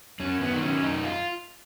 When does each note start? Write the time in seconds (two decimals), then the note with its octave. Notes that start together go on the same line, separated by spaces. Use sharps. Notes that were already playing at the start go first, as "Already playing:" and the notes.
0.20 F#2 C#4
0.41 B3
0.51 D#3 F#3
0.62 C#4
0.83 F#2 D#4
1.04 F4